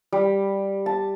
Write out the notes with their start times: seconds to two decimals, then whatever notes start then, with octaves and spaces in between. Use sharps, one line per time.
0.12 G3
0.86 A5